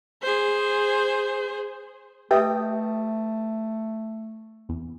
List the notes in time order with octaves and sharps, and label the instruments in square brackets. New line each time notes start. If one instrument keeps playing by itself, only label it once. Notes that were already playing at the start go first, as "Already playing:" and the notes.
[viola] G#4 C5
[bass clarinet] A3 [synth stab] G4 G5 D#6 [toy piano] B4 D#5 E5
[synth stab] E2